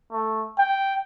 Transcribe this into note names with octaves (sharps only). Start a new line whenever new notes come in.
A3
G5